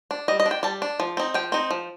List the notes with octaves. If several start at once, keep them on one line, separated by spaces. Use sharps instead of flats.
D4
G3 D#5
D#5
D4
G5
G3 A5
D4
F3
C4 D#4
F3 G5
C4 D#4
F3